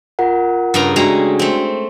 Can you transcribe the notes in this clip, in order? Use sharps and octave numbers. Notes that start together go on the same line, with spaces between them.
F4 A#4 F#5
G2 C#3 A#5
G#3 A3 D4 F#4 G5 A#5
A3 C4